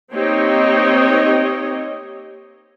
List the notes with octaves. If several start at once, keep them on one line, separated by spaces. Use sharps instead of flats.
A#3 C4 D#4 G4 C#5 D#5